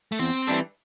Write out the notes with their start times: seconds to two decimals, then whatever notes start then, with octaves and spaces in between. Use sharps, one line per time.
0.12 A3
0.19 E2 C4
0.47 E3 G3 D4 A4